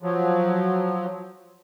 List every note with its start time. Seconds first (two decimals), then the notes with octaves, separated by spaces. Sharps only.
0.02 F3 F#3